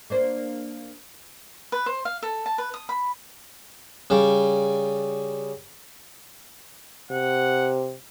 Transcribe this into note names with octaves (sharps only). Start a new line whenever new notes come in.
A#3 D4 C5
B4
C5
F5
A4
A5
B4
D#6
B5
C#3 G3
C3 F#5